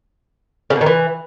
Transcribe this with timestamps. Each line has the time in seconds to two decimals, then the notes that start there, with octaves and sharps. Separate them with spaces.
0.70 C#3
0.76 B2
0.81 D#3
0.86 E3